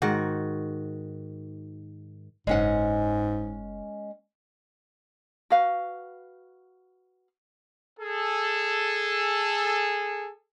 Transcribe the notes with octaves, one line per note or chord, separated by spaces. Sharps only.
G#2 D#3 F#4
F#1 G#2 G#3 C#4 F#5
F#4 B4 F5
G#4 A4